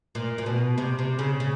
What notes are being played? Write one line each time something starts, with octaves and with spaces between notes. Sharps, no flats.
A#2
A#2
B2
C3
C3
C#3
C#3